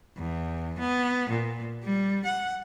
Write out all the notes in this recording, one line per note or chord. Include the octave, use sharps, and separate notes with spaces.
E2
B3
A#2
G3
F#5